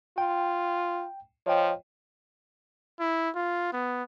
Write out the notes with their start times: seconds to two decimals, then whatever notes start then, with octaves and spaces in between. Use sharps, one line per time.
0.18 F4 G5
1.46 F3 C#5 D#5 G5
2.99 E4
3.35 F4
3.73 B3